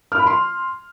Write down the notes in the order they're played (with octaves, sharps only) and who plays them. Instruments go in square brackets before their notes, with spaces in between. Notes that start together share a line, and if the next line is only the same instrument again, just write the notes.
[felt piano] F6
B5
C6